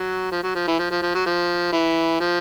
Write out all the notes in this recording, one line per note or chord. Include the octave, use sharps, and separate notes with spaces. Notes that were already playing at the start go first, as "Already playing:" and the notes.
Already playing: F#3
F3
F#3
F3
E3
F3
F3
F3
F#3
F3
E3
F3